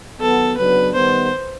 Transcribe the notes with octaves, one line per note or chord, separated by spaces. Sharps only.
D#3 F#3 B3 A4
F#2 C#3 F#3 B3 D4 B4
D#3 G3 B3 C5